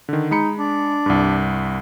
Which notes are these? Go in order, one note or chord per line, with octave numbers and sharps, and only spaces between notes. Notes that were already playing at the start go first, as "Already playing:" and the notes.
D3 D#3
G#3 D#4 B5 C#7
D4
C2 G2